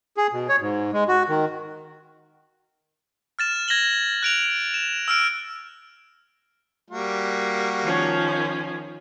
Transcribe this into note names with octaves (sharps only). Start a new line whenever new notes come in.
G#4
B2
C#5
G#2
G#3
F#4
D#3
F6 A6 E7
G#6 A#6 E7 F#7 G7
F#6 D7 F7
E7
E6 F6 D7
G3 A#3 F#4
D#3 F3 C#4